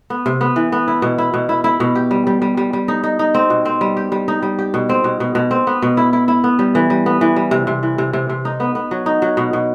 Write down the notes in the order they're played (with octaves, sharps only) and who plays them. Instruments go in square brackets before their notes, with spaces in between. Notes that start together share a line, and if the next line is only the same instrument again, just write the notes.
[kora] B3
C3
B3
E3
B3
E4
B2
E4
B2
E4
E4
B2
G4
G3
G3
G3
G3
G3
D#4
D#4
D#4
C4
B2
C4
G3
G4
G3
D#4
G3
G4
B2
C4
B2
B2
B2
C4
B3
B2
E4
E4
E4
B3
G3
E3
G3
B3
E3
G3
C3
C3
E3
C3
C3
C3
D#4
B3
B3
F#3
D#4
F#3
B2
B2